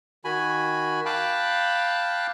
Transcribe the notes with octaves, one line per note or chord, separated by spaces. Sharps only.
D#3 F#4 G#5 B5
F5 G5 A5 B5 D6 F#6